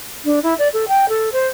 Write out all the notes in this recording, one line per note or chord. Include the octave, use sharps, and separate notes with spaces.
D4
E4
D5
A4
G5
A4
C5